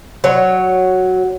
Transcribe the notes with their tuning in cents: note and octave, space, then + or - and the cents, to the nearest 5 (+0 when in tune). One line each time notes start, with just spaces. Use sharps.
F#3 +0 C#5 -5